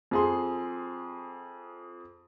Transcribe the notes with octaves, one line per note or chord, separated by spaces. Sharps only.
F2 G#4 C6